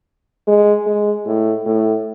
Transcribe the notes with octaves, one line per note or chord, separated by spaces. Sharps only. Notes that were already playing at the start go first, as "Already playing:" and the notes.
G#3
G#3
A2
A2